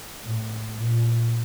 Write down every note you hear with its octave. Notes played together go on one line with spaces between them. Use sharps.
A2
A#2